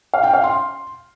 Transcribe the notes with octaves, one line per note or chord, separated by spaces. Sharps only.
F5
G5
F5
C6